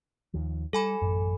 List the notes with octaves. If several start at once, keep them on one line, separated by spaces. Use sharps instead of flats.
D#2 D#3 F3
G3 A4 G#5 B5
A1 F#2